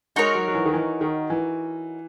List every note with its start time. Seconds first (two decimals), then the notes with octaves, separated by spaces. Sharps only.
0.16 G#3 D#4 F#4 A#4 C#5
0.35 F#3
0.48 F#3
0.55 E3
0.65 D#3
0.74 E3
1.01 D#3
1.30 E3